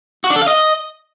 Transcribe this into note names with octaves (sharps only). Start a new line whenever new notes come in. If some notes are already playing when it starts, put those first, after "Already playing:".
F#4
D4
A4
F5
D#5